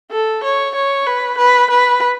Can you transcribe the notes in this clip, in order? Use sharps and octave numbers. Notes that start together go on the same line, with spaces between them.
A4
C#5
C#5
B4
B4
B4